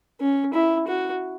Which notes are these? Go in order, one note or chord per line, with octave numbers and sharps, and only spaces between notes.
C#4
E4
F#4